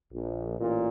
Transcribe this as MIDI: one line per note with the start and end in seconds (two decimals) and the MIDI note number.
0.13 0.58 34
0.60 0.89 33
0.60 0.89 46